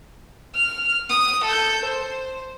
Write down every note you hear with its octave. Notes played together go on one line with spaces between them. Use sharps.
F6
D#6
A4 G6
C5